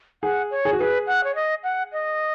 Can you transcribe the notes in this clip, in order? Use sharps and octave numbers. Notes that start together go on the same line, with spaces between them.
G#4 F#5
C#5
G#4
F#4
G#4 B4
F#5
C#5
D#5
F#5
D#5